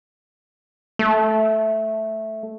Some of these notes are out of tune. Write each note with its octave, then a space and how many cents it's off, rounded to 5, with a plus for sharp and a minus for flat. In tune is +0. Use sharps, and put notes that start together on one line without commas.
A3 -5